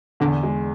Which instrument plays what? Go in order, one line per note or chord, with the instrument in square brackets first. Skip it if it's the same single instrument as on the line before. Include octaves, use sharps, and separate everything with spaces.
[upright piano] E2 [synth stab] D3
[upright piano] G#3